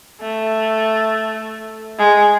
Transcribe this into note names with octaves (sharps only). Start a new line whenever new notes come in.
A3
G#3